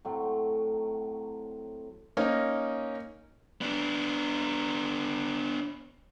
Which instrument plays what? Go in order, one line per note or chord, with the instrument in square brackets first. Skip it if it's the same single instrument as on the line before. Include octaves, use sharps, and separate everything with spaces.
[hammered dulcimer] A2 F#3 A3 C4
[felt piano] A#3 C#4 D#4
[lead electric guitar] B3 D4